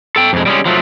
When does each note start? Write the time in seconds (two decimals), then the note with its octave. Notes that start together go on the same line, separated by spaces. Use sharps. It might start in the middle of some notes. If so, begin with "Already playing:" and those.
0.16 A4 G5
0.33 F2 G#3
0.46 G3 G#3 C#4
0.66 F3 F#3 A3